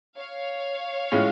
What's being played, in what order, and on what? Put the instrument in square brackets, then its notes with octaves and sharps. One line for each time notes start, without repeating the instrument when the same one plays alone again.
[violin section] C#5 F5
[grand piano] A2 G#3 C#4 F4